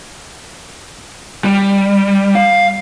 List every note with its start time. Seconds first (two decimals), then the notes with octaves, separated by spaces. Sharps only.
1.44 G3
2.35 F5